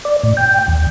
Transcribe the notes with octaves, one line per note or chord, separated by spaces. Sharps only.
D5
A2
G5
D#2